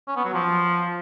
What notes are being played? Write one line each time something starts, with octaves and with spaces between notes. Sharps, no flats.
C#4
B3
F#3
F3